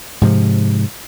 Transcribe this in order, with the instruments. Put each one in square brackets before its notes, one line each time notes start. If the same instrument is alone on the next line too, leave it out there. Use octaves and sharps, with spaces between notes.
[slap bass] G#2 C3 F3